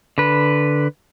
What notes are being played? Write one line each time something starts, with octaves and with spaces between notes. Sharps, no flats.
D3 B4